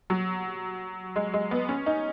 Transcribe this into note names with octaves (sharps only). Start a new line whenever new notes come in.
F#3
G#3
G#3
B3
C#4
D#4